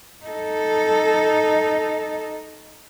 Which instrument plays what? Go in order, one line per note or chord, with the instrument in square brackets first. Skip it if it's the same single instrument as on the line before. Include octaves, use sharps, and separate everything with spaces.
[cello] D#4 A4